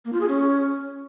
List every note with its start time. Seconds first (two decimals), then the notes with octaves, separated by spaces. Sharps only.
0.05 A#3
0.13 F4
0.21 G#4
0.29 C#4